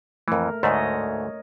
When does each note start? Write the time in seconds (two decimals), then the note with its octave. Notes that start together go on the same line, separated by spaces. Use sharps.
0.28 F2 E3 A3 A#4
0.63 D2 G#2 A3 C#5 D#5